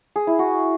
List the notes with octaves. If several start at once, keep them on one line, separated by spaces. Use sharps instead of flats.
G#4
E4
F#4